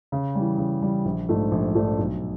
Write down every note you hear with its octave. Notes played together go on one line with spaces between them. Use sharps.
C#3
E3 G3
C#3
E3 G3
A#1
G#2 F3 A3 D4
A#1
G#2 F3 A3 D4
B1